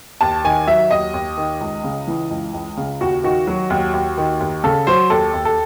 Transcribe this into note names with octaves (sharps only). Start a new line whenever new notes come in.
D#2 A5
D#3 G#5
F#3 E5
D#2 D#5
D#2
D#3
C#2
C#3
E3
C#2
C#2
C#3
D#2 F#4
D#3 F#4
F#3
D#2
D#2
D#3
D#2
C#3 A4
F#3 C5
D#2 A4
D#2
A4